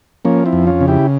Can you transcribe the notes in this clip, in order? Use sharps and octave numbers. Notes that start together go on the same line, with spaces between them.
F3 A#3 C#4
C4 E4
F2
C#4 F4
C#3
E4 G4